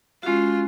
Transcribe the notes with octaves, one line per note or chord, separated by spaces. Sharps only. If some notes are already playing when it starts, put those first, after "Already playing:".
G#3 C#4 F4 F#4